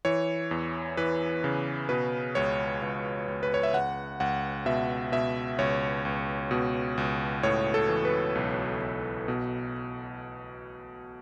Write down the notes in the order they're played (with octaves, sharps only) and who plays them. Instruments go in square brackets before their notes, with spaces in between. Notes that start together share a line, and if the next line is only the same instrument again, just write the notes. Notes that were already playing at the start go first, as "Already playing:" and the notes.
[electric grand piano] E3 C#5
E2
E3 B4
C#3
B2 B4
C#2 C#5
C#2
C#2
B4
C#5
E5
C#2 F#5
C#2 F#5
B2 E5
B2 E5
C#2 C#5
C#2
B2
C#2
A2 C#5
A4
E3
B4
B1
B1
B2